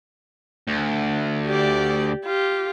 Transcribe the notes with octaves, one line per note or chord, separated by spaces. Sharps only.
D2
G4 D5
F4 G4